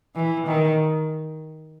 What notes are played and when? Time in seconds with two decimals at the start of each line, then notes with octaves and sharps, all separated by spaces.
0.16 E3
0.47 D#3